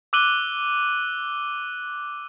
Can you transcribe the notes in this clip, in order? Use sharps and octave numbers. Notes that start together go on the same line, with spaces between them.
D6 E6 F#6 D#7 F#7 G7